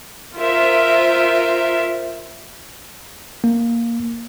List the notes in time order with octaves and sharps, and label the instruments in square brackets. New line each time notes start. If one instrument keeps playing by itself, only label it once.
[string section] F4 A#4 C5 E5
[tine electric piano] A#3